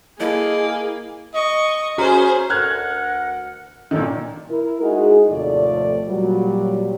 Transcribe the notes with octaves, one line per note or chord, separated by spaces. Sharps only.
A#3 E4 G#4 A4 D#5
D#5 C#6
C#4 F#4 G#4 C5 A#5
D2 A#4 F#5 F6 F#6 G#6
A#2 D3 D#3 F#3 A4
E4 A#4
G#3 D#4 E4 F#4 G#4
D#2 A2 C3 F3 A3 D5
A#2 F#3 G3